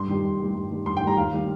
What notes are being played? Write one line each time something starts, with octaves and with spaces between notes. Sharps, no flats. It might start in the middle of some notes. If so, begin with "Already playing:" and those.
Already playing: G2 C6
D#3 G3
G2
D#3 G3
G2
D#3 G3
G2 C6
G5
D#3
G3 A#5
D#2 F5
D#3 G3